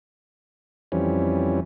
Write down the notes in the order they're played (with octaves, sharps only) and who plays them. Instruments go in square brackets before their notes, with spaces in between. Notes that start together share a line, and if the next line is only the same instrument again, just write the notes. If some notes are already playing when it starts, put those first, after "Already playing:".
[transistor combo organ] F2 E3 G3 C#4